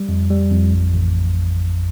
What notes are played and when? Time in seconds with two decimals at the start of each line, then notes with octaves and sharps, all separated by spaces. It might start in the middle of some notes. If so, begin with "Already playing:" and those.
Already playing: G3
0.09 F2
0.30 G3
0.51 F2
0.72 A1
0.93 A1